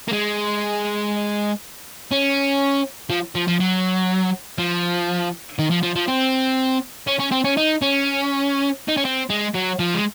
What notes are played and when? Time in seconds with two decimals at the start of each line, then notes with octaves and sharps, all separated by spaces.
0.09 A#3
0.13 G#3
2.11 C#4
3.10 F3
3.35 F3
3.48 F3
3.60 F#3
4.59 F3
5.59 D#3
5.71 F3
5.83 F3
5.95 F3
6.08 C4
7.07 C#4
7.19 C#4
7.31 C4
7.44 C#4
7.57 D#4
7.82 C#4
8.88 D#4
8.97 C#4
9.05 C4
9.30 G#3
9.55 F#3
9.79 F3
9.94 G#3